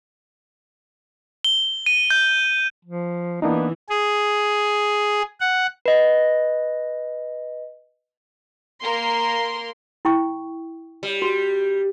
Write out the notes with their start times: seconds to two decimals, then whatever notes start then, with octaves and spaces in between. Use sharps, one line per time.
1.44 G7
1.86 D#7
2.10 G6
2.85 F3
3.42 E3 A#3 B3 D4 D#4
3.89 G#4
5.40 F#5
5.86 B4 D#5
8.83 A#3 A#4 C6
10.05 E4 G5 C#6
11.03 G3
11.22 F#4